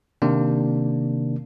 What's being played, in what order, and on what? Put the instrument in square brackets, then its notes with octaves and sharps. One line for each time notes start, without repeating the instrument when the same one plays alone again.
[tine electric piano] C3 D#3 A#3 D4